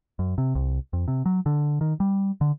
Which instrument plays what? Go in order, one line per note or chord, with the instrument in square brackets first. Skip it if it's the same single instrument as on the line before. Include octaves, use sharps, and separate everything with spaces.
[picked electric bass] F#2
C3
C2
F2
C3
F#3
D3
D#3
G3
D3